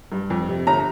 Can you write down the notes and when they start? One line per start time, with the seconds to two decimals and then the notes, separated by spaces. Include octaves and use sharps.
0.12 G2
0.30 F2
0.49 C3
0.67 G1 A#5